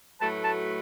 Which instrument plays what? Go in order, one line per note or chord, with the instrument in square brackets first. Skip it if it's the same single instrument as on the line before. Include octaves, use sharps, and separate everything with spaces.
[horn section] A2 F#3 A3 F#4 B4 [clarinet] A5
[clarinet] A5